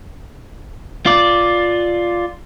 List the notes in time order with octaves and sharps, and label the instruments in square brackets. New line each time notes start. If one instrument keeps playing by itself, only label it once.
[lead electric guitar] F4 D5